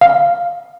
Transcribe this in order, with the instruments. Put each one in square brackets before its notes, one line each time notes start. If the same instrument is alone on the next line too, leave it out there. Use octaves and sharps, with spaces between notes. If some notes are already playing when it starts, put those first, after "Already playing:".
[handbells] F5